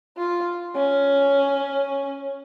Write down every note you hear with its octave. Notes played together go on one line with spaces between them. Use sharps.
F4
C#4